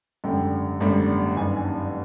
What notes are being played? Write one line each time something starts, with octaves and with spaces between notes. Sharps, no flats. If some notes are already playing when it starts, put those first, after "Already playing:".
G#1 F#2 D3 G3 G5
G#1 F#2 D3 G3
G1 F#2 D#3 G3 G#5
G#5
A5